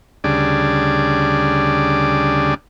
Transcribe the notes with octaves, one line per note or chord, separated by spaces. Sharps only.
D2 C#3 G3 D4 G#4 D5